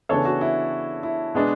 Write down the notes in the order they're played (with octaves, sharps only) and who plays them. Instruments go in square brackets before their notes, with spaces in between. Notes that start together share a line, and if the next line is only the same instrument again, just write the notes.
[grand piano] C#3 E3 B3 D4 A4 C#5
F#4
E4
E4
B2 G#3 B3 D4